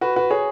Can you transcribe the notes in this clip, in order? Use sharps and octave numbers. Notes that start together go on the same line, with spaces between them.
F#4 B4
F#4 B4
G#4 C#5